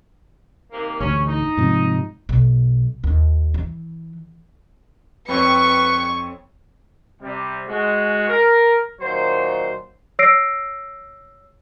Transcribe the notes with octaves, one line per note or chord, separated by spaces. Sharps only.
C3 D#3 A#3
A1 D2 C#4
D#4
G#2 C3 F3
B1
D#2
E3
F2 C4 B4 C#5 C#6 C#7
C3 G3
G#3 F#4
A#4
A#2 D#3 F#3 C5
C#5 E6 A#6 C7 D7